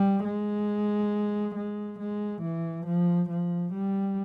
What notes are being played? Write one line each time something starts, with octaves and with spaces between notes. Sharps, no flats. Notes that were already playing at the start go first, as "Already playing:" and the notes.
Already playing: G3
G#3
G#3
G#3
E3
F3
F3
G3